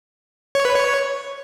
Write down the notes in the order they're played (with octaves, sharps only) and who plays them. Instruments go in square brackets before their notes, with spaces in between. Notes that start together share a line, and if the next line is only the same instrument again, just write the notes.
[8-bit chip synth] C#5
B4
C#5